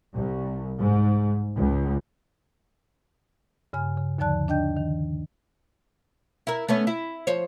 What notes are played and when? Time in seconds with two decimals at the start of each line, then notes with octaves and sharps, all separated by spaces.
0.14 C2
0.80 G#2
1.56 C#2
3.73 G2 C#3 G#5 F6
3.97 C#3
4.18 D#2 D3 F3 D5 A5 F#6
4.48 D4 D#5 G5 G6
4.77 D#3
6.47 E4 A#4
6.68 A3 B3 C#4
6.87 E4
7.27 F3 C5 C#5